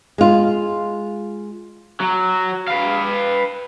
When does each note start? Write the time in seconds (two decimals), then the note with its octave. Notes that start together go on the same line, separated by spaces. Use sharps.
0.18 G#3 F4
2.00 F#3
2.68 B4 F5